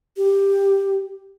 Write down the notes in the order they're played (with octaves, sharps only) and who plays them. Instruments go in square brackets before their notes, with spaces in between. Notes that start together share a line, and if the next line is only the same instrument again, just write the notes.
[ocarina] G4